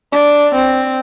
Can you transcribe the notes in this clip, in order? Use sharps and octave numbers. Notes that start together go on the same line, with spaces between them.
D4
C4